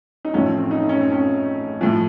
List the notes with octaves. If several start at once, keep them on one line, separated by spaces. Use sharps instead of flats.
D#4
A1 A2 F3 C#4
C4
C4
D#4
C#4
C4
C#4
A2 F3